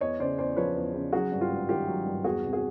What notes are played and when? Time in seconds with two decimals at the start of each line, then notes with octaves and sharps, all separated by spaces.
0.01 E2 C#5 D#5
0.20 C#3 C5 D5
0.38 E2 C5 D5
0.56 F3 B4 C#5
0.76 E2
0.94 C#3
1.13 F#3 F#4 G#4
1.32 G2
1.41 F4 G4
1.50 G#1
1.69 D#3 F4 G4
1.87 F#3
2.06 G2
2.24 E2 F#4 G#4
2.44 C3
2.53 F#4 G#4